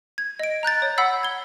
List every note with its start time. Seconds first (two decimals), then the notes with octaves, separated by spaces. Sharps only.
0.18 G#6
0.39 D#5 D7
0.63 A#5 F#6 G6 A6
0.82 C#5
0.98 F#5 B5 E6 B6 C7
1.23 G#6 G7